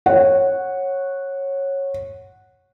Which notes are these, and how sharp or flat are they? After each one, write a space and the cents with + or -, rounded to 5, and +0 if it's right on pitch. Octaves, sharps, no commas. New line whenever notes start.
C#5 -15 F#5 -5